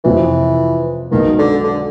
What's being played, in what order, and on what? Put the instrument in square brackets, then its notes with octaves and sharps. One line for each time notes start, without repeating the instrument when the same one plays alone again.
[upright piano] F2 C3 F3 [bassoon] E3
[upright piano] B1 B2 G#3 B3 [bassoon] D#3
[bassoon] D3
D3